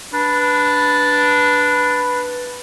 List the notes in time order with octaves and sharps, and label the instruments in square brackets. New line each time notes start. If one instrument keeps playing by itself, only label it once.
[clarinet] D4 [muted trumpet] B4